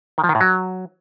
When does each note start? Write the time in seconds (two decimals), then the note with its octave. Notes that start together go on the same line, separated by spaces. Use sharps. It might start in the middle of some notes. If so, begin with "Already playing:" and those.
0.18 D#3
0.24 F3
0.29 D#3
0.35 A2
0.41 F#3